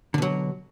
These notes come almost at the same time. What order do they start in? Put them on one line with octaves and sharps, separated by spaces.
D3 B2 F#3